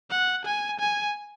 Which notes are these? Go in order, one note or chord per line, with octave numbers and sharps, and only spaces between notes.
F#5
G#5
G#5